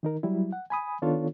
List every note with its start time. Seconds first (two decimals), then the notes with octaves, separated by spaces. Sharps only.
0.03 D#3 D#4 A#4
0.23 F#3 G3 E4
0.52 F#5
0.70 G#5 B5 D#6
1.02 D#3 B3 D4 F4 A4 C#5